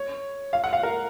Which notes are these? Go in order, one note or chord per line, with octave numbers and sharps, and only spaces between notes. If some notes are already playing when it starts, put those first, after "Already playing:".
Already playing: C#5
F5
F#5
F5
A#4